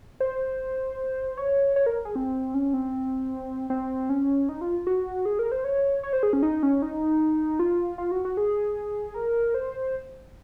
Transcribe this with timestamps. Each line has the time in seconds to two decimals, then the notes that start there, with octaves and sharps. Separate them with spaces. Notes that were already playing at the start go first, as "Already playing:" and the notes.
0.20 C5
1.37 C#5
1.76 C#5
1.86 A#4
2.05 G#4
2.16 C4
2.54 C#4
2.74 C4
3.70 C4
4.10 C#4
4.49 D#4
4.61 F4
4.87 F#4
5.25 G#4
5.39 A#4
5.52 C5
5.64 C#5
6.03 C#5
6.13 C5
6.23 G#4
6.33 C#4
6.43 D#4
6.63 C#4
6.82 D#4
7.59 F4
7.98 F4
8.11 F#4
8.25 F#4
8.37 G#4
9.14 A#4
9.54 C5